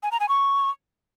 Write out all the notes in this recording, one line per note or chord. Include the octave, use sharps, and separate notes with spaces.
G#5
A#5
G#5
C#6